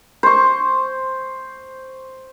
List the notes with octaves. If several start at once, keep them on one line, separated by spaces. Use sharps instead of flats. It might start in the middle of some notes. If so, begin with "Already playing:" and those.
C5 C#6